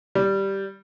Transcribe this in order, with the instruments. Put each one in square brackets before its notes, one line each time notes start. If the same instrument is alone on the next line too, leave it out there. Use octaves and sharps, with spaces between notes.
[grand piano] G3